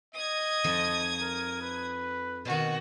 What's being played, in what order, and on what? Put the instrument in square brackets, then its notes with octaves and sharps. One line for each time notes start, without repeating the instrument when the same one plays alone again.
[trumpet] D#5 [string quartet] D#6 G#6
[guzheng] F2 F3 D#4
[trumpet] A#4
B4
[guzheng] B2 D#3 [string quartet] F#4